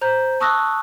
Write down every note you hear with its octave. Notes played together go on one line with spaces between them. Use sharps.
C5 A#5 G6
A5 C#6 D#6 E6 F#6 A#6